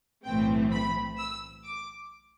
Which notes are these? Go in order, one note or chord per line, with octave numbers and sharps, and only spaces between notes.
B1 A2 E3 A3 C4 G5
B5
E6
D6